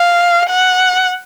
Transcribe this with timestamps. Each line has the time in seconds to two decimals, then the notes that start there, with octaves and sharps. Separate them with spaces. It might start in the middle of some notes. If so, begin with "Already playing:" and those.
Already playing: F5
0.49 F#5